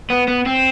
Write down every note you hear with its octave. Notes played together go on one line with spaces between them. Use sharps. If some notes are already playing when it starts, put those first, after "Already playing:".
B3
B3
C4